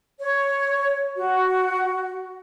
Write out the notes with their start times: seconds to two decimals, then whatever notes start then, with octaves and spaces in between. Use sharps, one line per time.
0.20 C#5
1.16 F#4